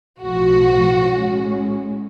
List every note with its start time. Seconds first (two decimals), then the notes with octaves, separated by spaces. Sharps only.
0.20 B1 A2 F3 F#4
1.05 A2 G#3 C#4